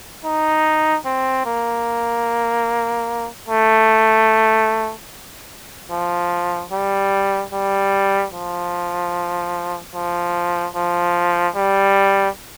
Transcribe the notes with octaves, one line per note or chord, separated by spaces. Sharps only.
D#4
C4
A#3
A3
F3
G3
G3
F3
F3
F3
G3